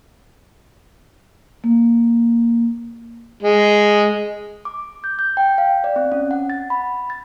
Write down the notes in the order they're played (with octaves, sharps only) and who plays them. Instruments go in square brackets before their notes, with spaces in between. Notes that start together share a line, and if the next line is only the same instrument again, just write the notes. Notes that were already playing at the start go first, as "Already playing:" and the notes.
[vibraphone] A#3
[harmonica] G#3
[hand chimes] D6
G6
G6
G5
F5
D5
C4
C#4
F#5
A6
B5
A6